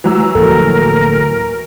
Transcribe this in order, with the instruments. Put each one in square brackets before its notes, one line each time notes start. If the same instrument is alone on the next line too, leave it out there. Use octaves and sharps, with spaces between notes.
[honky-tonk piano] E3 F#3 E6
[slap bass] D1 F3 A#3 [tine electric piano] A4 [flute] A#4